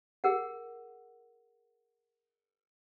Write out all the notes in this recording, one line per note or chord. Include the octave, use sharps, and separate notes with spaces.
G#4 A#4 F#5